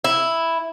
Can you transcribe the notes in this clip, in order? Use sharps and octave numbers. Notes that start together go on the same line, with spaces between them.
E4